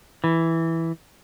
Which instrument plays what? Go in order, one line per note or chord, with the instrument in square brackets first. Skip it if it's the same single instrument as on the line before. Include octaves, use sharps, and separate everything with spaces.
[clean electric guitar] E3